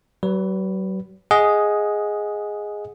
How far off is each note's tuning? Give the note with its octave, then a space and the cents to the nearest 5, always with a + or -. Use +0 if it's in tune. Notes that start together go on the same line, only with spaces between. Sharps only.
F#3 +45 B4 +0
G#4 +0 D#5 +10 F#5 -20